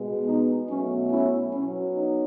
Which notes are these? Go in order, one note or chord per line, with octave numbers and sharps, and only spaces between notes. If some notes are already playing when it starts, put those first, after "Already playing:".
Already playing: B2 G#3 B3
D#4
B2 F#3 A3 C#4
C#4 E4
B2 F#3 B3 C#4
D#4